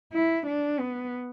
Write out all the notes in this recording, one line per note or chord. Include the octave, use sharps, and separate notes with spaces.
E4
D4
B3